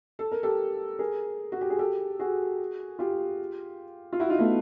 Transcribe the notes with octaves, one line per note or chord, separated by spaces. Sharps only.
A4
A#4
G4 A4
G#4 A#4
F#4
G4
G#4
G4 A4
F#4 G#4
F4 G4
F4
E4 F#4
D#4 F4
A3 B3